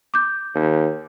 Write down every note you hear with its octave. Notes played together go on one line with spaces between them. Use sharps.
D6 G6
D#2